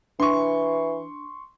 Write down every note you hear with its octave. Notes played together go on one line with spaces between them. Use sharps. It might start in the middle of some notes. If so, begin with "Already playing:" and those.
E3 D4 C6 C#6